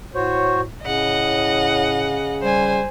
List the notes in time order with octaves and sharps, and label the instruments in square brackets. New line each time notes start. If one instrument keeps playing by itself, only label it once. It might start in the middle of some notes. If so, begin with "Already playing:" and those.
[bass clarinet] A2 [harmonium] F#4 C5 C#5
[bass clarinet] A2 [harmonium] C#3 [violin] D#5 F#5
[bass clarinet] G3 [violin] C5 G#5